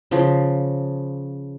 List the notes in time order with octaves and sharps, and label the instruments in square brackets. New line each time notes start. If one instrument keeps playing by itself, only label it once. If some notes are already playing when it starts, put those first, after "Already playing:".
[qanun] C#3 F3